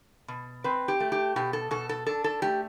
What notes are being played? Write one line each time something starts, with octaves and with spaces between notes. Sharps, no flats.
B2
C4 B4
G4
A3
G4
B2 G4
A4
B2 A4
A4
D4 A4
A4
A3 G4